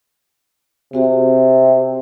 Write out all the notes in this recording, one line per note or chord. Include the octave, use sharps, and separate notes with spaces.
C3 C4 F#4 G#4